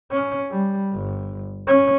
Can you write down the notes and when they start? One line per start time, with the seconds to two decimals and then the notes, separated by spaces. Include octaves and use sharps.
0.12 C#4
0.51 G3
0.93 G1
1.67 C#4